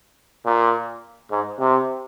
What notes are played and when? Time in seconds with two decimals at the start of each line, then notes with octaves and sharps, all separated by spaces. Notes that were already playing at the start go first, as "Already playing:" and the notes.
0.46 A#2
1.31 G#2
1.60 C3